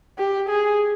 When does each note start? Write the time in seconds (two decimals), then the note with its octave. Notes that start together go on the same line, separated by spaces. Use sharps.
0.18 G4
0.49 G#4